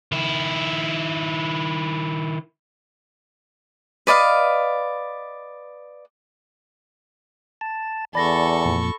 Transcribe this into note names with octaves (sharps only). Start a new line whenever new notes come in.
D#3 E4
B4 D5 D#5 F5
A5
E2 A4 D5 B5 C#6 A#6
F2 A#2